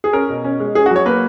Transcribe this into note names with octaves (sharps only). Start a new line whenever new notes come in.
G#4
C#4 A#4
B2
C#4
G#3
C#4 G#4
F#4
F#3 C#5
A#3 B4